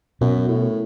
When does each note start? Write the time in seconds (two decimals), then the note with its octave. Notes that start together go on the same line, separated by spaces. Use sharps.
0.21 F#2 B2
0.48 A2